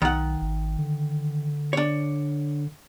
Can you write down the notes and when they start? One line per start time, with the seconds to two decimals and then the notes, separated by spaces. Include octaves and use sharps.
0.02 B1 D#3 F#5
0.41 G#1
0.78 D3
1.73 D4 C#5